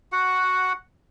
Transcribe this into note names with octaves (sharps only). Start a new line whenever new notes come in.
F#4 F#5